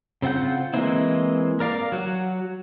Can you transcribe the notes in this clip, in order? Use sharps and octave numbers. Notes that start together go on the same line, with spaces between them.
C#3 C4 F4 F#5 G6
E3 G#3 A#3 C4 E4
A#4 D5 F5 D6
F#3 F#4